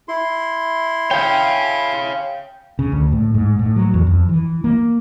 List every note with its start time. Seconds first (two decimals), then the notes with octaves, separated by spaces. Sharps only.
0.08 E4 C6
1.11 C#5 F5 G5
2.79 C#3
2.92 D2
3.13 A2
3.34 G#2
3.59 A2
3.76 F#3
3.94 E2
4.07 F2
4.29 E3
4.64 A#3